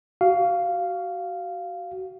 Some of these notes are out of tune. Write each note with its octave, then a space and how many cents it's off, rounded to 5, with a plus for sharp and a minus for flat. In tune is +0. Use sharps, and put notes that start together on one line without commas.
F#4 +25 F5 -5